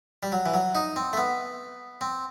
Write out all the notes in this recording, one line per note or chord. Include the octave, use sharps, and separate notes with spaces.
G3
F#3
E3
F#3
D#4
C4
A3
B3
C4